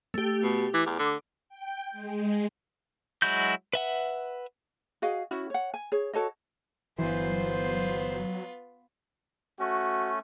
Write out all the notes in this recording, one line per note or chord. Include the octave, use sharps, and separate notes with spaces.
A3 G4
B2
E3 D6
E2
D3
G5
G#3
F#3 G#3 E4 F#4 G6
B4 E5 F#5
F#4 G#4 D#5 F5
C#4 E4 F#4
C#5 F#5
G#5
G#4 C#5
F#4 A4 C#5 D#5
G1 E3 F#3 B3 F4 C5
A3 C#4 F#4